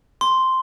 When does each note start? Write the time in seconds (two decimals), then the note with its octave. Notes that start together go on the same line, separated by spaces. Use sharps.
0.21 C6